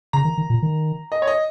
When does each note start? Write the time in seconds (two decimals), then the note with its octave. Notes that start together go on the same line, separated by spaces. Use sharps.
0.13 C#3 A#5
0.25 D#3
0.38 D#3
0.50 A#2
0.62 D#3
1.12 D#5
1.22 C#5
1.27 D#5